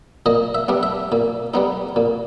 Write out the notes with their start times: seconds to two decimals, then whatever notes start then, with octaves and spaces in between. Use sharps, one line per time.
0.26 A#2 D#5
0.55 E5
0.68 G3 B3 D4
0.83 E5
1.12 A#2
1.54 G3 B3 D#4
1.96 A#2